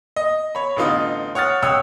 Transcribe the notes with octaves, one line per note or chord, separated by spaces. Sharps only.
D#5
C#5 B5
A1 D3 B3 D#4 F4 D#6
C#5 F#5 D#6 F6 A6
C#2 C#5 F#5 G5 D#6 E6